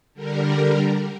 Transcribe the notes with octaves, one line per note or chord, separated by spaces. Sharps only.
D3 G3 A#4